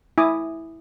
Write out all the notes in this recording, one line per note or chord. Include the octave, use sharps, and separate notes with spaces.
E4 G#5 D6 D#6